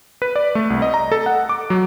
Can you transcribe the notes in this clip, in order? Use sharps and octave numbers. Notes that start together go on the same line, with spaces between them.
B4
D5
A3
C2
D#5
A#5
A4
F#5
D6
F#3